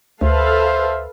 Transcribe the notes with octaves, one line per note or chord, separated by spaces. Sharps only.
D2 A4 B4 C5 E5 F5